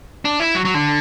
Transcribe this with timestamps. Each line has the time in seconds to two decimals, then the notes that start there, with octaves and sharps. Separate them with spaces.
0.25 D4
0.40 E4
0.55 F#3
0.65 F#3
0.74 D3